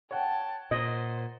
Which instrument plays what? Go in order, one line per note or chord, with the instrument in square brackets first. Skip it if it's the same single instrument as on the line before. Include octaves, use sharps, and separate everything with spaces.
[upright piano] C#5 F#5 [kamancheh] G5 A5
[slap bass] A#2 [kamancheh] C5 [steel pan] D#5